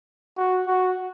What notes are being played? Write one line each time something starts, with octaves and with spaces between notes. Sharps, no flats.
F#4
F#4